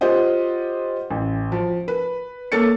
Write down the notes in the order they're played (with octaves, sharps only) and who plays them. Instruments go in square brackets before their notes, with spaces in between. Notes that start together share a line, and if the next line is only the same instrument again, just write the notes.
[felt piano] F4 G4 C5 D#5 F#5
A1
F3
B4
A#3 A4 C#5 A6 C#7